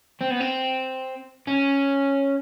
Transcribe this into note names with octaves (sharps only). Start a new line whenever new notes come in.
C4
B3
C4
C#4